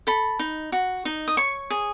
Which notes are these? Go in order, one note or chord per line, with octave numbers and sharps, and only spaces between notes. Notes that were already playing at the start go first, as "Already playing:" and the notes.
A4 B5
D#4
F#4
D#4
D#6
C#5 C#6
G#4